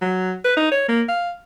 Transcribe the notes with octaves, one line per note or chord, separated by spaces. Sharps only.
F#3
B4
D#4
C#5
A#3
F5